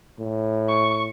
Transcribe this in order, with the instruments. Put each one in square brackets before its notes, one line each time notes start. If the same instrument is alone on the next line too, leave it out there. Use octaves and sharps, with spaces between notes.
[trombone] A2
[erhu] C#6